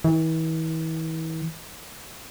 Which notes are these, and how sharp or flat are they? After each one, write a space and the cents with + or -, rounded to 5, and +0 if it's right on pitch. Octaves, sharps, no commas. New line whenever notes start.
E3 -40